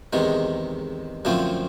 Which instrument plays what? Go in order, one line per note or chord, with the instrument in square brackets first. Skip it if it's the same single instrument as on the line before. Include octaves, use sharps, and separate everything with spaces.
[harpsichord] E2 C3 D#3 G#3
F#2 D3 F3 A3 C4